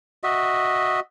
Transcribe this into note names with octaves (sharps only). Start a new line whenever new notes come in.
F#4 D#5 E5